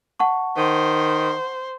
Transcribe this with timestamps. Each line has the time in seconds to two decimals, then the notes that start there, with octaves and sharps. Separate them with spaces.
0.20 F#5 A5 C#6
0.57 D#3 C5